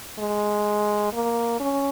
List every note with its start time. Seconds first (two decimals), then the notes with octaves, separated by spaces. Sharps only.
0.19 G#3
1.13 A#3
1.60 C#4